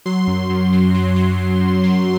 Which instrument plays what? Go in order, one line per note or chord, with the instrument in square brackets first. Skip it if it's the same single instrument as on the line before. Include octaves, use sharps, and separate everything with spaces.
[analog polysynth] F#3 C6
F#2
F#2
F#3
F#3
F#3
F#2
F#2
F#3